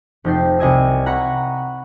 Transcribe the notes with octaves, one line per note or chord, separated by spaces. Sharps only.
F1 F3 D#4 G5 A6 C7
C2 D#5 G#5 E6
F#5 A#5 B5 C#6 F#6